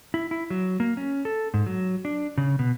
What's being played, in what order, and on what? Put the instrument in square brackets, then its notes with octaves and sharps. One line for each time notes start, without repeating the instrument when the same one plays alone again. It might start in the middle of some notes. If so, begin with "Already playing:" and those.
[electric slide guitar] E4
E4
F#3
A#3
C#4
A4
G#2
F#3
D4
C#3
B2